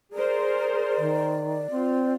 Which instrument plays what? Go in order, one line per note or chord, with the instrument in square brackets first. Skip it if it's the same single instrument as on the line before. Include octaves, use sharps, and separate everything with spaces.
[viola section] G#4 A#4 C5 [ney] D5
[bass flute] D#3
[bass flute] C4 [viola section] F4